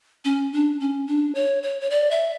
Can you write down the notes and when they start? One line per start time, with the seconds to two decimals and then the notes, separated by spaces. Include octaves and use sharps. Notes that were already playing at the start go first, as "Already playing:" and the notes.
0.25 C#4
0.53 D4
0.80 C#4
1.07 D4
1.35 C#5
1.63 C#5
1.81 C#5
1.90 D5
2.11 E5